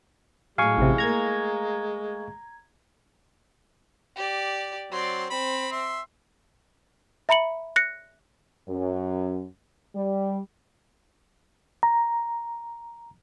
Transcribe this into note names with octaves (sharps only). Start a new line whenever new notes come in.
A2 F#3 G#3 F5 G#5 C#6
A1 C3
A3 A#3 A#5 G#6
G4 D5
F#3 C4 D5 C6
C4 B5
E5 C6
E5 A#5 B5 C#7 F#7
F#6 A#6 C#7
F#2
G3
A#5